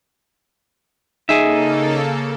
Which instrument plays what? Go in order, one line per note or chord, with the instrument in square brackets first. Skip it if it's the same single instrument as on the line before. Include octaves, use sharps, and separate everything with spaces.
[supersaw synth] C#3 A#3 A4 [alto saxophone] D#4 [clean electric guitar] G#4 E5